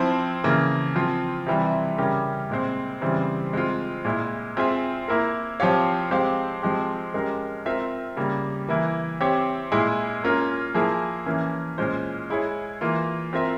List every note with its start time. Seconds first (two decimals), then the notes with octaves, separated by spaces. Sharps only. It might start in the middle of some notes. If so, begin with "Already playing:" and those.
Already playing: F3 C4 E4
0.44 C#3 E3 A#3
0.95 F3 C4 F4
1.47 C3 E3 G3 C4
1.98 C#3 G3 C#4 G4 A#4
2.50 A#2 G#3 C4
3.01 C#3 E3 G3 C4
3.53 G#3 C4 F4
4.05 A#2 G#3 E4
4.57 C4 F4 G#4 E5
5.08 A#3 E4 A#4
5.60 F3 C4 G4 C#5 F5
6.11 G#3 C4 G4 C5 F5
6.62 F3 G#3 C4 G4
7.14 G#3 C#4 G4 A#4
7.66 C4 F4 A#4 E5
8.17 C#3 G3 A#3
8.69 E3 A#3 E4
9.21 C4 G4 C#5 E5
9.72 A#2 G#3 E4 G#4
10.24 A#3 C#4 F4 A#4
10.74 F3 A#3 E4 G#4
11.26 E3 A#3 C#4
11.78 A#2 G#3 C#4 F4 C5
12.30 G#3 E4 G#4 C#5
12.81 E3 A#3 F4
13.33 C4 F4 A#4 E5